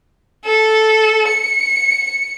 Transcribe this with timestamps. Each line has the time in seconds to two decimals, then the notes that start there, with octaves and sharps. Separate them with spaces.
0.45 A4
1.28 C#7